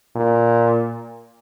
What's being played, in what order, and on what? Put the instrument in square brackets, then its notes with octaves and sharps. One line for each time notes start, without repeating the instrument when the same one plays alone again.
[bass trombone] A#2